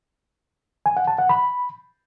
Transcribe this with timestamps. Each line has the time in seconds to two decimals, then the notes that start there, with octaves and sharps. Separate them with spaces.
0.86 G#5
0.97 F#5
1.08 A5
1.19 F#5
1.29 B5